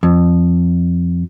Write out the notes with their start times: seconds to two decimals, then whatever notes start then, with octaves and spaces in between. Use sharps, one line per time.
0.03 F2